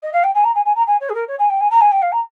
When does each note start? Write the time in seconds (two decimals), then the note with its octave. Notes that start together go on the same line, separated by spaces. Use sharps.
0.02 D#5
0.13 F5
0.23 G5
0.34 G#5
0.44 A#5
0.55 G#5
0.65 G#5
0.75 A#5
0.87 G#5
1.00 C#5
1.09 G#4
1.14 A#4
1.28 C#5
1.39 G#5
1.49 G5
1.60 G#5
1.70 A#5
1.81 G#5
1.91 G5
2.02 F5
2.12 A#5